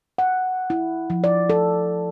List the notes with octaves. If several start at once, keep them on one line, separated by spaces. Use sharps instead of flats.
F#5
E4
F3
D5
A4